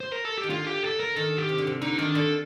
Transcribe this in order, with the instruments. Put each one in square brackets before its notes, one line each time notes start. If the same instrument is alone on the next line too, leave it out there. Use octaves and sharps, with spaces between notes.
[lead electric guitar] C5
A#4
A4
G4
[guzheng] D#3
[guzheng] D3 [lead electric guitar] F4
[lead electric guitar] G4
A4
A#4
[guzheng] D#3 [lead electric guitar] A4
[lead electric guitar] G4
[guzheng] C3
D3
C3
[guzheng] D3 [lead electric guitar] D#4
[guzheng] D#3 [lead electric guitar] D4
[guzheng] D3 [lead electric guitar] A4